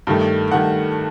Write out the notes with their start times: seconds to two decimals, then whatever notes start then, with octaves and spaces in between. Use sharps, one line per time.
0.07 G2 D#3 A3
0.51 G2 D#3 A3 F#5